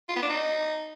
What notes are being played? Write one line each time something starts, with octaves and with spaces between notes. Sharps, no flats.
F4
B3
D4
D#4